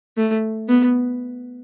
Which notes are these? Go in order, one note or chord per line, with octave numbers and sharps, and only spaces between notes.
A3
B3